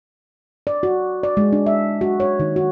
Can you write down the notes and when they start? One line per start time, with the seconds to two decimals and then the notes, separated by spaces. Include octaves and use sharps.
0.67 D5
0.83 F#4
1.23 D5
1.37 G#3
1.53 D4
1.66 E5
2.01 F#4
2.20 C#5
2.40 D#3
2.56 F#4